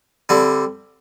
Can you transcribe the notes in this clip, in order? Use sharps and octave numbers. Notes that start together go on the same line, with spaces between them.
D3 G3 C4 E4